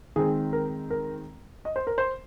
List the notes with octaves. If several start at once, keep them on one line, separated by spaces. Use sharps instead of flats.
D#3 G#3 C4 G#4
A#4
A#4
D#5
C5
A#4
C5